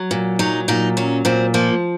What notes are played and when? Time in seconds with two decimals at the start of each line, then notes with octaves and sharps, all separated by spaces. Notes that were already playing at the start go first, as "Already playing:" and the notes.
Already playing: F#3
0.11 A#2
0.39 F#3 D#4
0.68 A#2 D#4
0.97 F#3 C#4
1.25 A#2 C4
1.54 F3 A#3